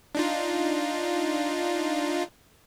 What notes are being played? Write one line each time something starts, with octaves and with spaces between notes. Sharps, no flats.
D4 D#4 F4